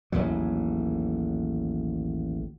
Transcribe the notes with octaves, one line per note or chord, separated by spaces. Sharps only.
A1 D#2 G#2 F#3